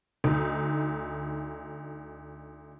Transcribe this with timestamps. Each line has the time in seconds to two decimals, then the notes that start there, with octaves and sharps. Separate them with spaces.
0.24 D2 D#4